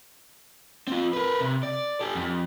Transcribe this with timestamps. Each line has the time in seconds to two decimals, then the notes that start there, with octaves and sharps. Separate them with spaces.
0.87 C4 F4
1.13 A#4 B4
1.40 C3
1.63 D5
2.01 G4 A4
2.15 F2